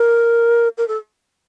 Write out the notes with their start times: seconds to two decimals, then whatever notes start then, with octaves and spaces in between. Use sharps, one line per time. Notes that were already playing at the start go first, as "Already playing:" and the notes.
Already playing: A#4
0.78 A#4
0.88 A4